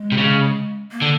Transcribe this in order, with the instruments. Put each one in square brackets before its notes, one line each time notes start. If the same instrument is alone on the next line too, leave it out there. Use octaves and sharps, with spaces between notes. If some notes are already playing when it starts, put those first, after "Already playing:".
Already playing: [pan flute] G#3
[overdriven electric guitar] C3
C#3
[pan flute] A#3
[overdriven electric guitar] D3